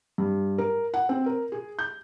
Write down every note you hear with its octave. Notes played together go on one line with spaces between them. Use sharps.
G2
A#4
F#5
C4
A#4
G#4
G6